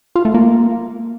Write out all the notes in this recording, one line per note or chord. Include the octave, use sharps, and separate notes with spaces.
F4
A3
A#3